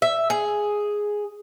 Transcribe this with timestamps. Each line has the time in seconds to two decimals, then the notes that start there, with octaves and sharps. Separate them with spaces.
0.02 E5
0.30 G#4